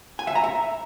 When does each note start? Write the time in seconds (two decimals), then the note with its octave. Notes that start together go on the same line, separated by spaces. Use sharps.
0.19 G#5
0.27 E5
0.35 A#5
0.44 E5